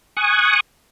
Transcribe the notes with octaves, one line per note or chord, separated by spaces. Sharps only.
G#5 C#6 D#6 F#6